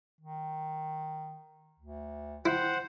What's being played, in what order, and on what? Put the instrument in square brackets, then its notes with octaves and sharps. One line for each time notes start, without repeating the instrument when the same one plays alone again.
[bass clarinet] D#3
D2
[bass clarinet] D#3 [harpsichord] E4 [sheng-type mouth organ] C5 F#5